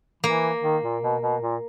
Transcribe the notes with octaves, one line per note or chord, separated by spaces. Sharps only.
E3 A#3
D#3
A#2
B2
B2
A#2